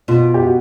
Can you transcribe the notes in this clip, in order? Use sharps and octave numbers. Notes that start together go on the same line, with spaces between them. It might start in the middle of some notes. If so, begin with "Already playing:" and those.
B2 F4
G4
F#4